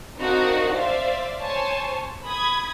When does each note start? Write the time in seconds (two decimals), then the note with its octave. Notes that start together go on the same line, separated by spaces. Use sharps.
0.17 C4 D4 D#4 F#4 A#4 F5
0.71 C5 D5 E5 F5
1.41 C5 C#5 G#5 A5
2.25 B5 D#6 G#6